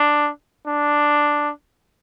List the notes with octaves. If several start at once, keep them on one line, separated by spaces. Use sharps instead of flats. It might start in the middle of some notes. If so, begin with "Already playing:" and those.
Already playing: D4
D4